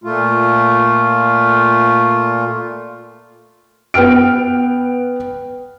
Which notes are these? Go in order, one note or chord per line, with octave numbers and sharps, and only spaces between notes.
A#2 A3 F4
B3 B4 G5 F6 D7